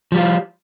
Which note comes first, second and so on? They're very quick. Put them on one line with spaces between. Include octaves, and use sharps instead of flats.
F3 G3 F4